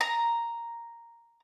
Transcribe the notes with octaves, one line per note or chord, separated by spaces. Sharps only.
A#5